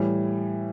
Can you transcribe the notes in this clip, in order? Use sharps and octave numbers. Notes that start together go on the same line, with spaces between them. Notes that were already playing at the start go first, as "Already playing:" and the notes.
Already playing: A2 E3 G3